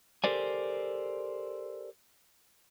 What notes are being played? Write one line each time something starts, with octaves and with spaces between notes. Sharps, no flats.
G4 A4 A#4 C5 D5 G#5